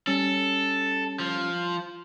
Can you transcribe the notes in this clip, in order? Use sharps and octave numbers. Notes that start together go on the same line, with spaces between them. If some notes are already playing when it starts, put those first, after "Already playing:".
G3 C#4 A4
F3